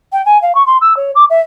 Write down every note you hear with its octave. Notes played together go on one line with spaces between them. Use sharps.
G5
G#5
F5
C#6
C6
E6
C#5
D6
E5